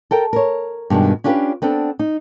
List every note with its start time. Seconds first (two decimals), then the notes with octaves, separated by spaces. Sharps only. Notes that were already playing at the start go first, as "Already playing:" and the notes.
0.11 A4 A#4 G5
0.33 A#4 C#5
0.90 G2 B2 D#3 G#3 D4
1.24 C#4 D4 F4 G4 A#4 B4
1.62 B3 C4 D4 A4
1.99 D#4